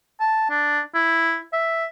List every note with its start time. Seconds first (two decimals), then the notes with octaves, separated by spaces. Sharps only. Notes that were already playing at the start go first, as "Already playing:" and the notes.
0.20 A5
0.50 D4
0.94 E4
1.53 E5